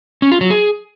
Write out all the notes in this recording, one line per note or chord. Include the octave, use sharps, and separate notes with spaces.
C#4
F4
F#3
G#4